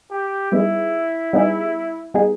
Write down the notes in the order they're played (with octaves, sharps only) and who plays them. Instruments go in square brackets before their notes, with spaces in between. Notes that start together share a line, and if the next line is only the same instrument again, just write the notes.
[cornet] G4
[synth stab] G3 B3 D#4 G#4 [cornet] E4
[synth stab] G3 B3 D#4 G#4
G3 B3 D#4 G#4